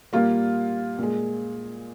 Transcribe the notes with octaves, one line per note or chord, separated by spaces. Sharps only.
A#2 G3 A#3 F4
A#2 G#3